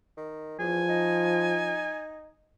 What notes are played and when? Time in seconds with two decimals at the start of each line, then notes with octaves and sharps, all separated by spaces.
0.18 D#3
0.60 E2 F3 G#5
0.90 D#4